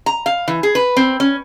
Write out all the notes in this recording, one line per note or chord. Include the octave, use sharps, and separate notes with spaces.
A#5
F5
E3
G#4
B4
C4
C#4